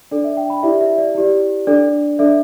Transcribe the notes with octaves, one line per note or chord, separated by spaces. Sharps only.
D4 A4 D5
E5
G5
B5
E4 G4 D5 E5
E5
D5
E4 G4 D5
D4 A4 D5
D4 A4 D5 E5